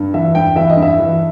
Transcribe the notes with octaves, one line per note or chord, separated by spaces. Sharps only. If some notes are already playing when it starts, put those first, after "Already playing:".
Already playing: G2
E3 E5
G2 G5
E3 E5
D#5
G2
E5
E3